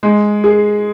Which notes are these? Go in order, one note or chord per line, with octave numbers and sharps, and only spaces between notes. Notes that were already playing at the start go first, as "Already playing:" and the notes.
G#3
G#4